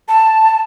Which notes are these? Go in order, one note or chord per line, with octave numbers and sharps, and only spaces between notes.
A5